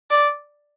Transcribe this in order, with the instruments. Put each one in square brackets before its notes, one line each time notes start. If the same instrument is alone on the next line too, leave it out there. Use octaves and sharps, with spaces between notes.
[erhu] D5